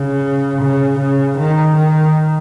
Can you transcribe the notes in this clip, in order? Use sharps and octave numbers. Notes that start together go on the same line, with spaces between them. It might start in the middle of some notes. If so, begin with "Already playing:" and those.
Already playing: C#3
C#3
C#3
D#3
D#3